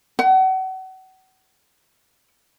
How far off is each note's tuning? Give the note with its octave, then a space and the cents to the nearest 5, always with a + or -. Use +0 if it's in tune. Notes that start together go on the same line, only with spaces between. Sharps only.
F#5 +35